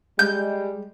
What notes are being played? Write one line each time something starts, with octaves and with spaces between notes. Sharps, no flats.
G3 G#3 G6